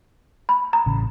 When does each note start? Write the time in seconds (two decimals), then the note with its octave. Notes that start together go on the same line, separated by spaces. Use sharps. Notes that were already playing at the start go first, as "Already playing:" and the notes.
0.49 B5
0.73 A#5
0.86 A1 C#3